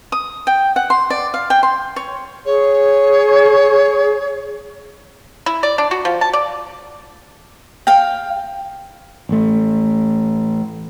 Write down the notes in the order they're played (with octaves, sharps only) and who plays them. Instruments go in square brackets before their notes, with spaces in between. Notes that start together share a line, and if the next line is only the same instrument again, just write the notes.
[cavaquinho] D#6
G5
F#5
C6
D5
F5
G5
C6
C#5
[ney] G#4 [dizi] C#5
[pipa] E4
D5
D4
F#4
F3
A5
D5
[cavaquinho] F5 G5
[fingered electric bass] A1 A3